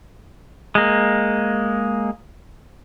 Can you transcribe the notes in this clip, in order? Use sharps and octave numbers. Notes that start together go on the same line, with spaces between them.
G#3 A#3